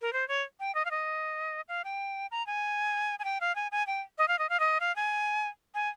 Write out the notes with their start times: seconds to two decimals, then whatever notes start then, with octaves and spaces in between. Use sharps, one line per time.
0.02 A#4
0.13 C5
0.28 C#5
0.60 G5
0.75 D#5
0.85 F5
0.91 D#5
1.68 F5
1.84 G5
2.31 A#5
2.47 G#5
3.19 G#5
3.24 G5
3.41 F5
3.56 G#5
3.72 G#5
3.87 G5
4.18 D#5
4.28 F5
4.39 D#5
4.49 F5
4.60 D#5
4.80 F5
4.96 G#5
5.75 G#5